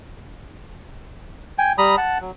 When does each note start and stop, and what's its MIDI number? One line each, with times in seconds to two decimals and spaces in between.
1.58 1.73 79
1.58 1.73 80
1.78 1.96 55
1.78 1.96 82
1.78 1.96 83
1.78 1.96 87
1.97 2.18 78
1.97 2.18 81
2.21 2.31 54